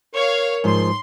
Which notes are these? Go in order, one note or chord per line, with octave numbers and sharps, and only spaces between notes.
A#4 C#5 F5
G#2 F3 C6